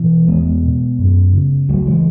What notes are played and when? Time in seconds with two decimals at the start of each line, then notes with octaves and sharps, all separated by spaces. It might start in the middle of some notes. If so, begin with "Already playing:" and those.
Already playing: B2 E3
0.28 E2 G#3 B3
0.63 B2
0.99 F#2
1.33 C#3
1.68 C#2 F#3 A3
1.86 E3 G#3